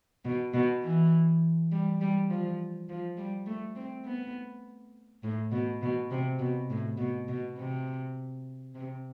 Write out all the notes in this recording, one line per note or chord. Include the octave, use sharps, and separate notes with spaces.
B2
B2
E3
G3
G3
F3
F3
G3
A3
C4
B3
A2
B2
B2
C3
B2
A2
B2
B2
C3
C3